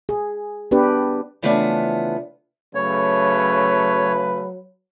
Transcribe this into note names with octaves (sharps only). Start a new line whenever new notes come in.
G#4
B3 D4 G4 B4
C#3 E3 F3 A3 B3 D4
C#3 F#3 A3 B4 C#5